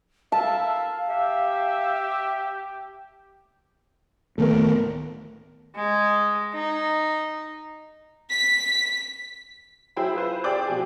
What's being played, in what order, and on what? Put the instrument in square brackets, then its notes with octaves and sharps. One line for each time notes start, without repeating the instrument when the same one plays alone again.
[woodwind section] E4 A#4 E5 [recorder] F5 [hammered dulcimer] A5
[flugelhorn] G4 [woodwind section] E5
[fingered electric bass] D1 D#3 B3 [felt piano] A3 A#4
[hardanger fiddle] G#3
D#4
[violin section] B6
[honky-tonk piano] F#3 E4 G#4 C5 G5 B5
E4 F4 B4 C5
G4 G#4 C5 D5 D6 G6
B2 F3 G4 G#5